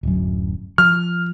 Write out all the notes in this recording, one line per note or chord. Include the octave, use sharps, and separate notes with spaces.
D1 F#2
F3 F6